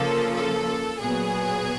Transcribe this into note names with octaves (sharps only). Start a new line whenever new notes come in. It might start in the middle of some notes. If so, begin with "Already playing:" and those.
Already playing: C#3 F3 A#3 A4
A4
A#2 F#3 B3 G#4